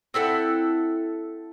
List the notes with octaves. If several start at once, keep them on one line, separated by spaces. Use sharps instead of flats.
C4 E4 A4 F#5